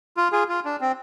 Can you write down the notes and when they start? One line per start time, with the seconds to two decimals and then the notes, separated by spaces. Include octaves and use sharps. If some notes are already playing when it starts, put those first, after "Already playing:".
0.17 F4
0.32 F4 G#4
0.49 F4
0.65 D4
0.81 C4